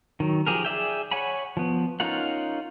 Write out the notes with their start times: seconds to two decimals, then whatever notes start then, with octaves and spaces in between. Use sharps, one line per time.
0.20 D#3 F#3
0.46 F3 G4 G#4 A#4
0.65 G#4 D5 E5 G5
1.11 C#5 F#5 G#5 B5
1.57 F3 B3
2.00 C#4 D#4 F4 A#4 F#5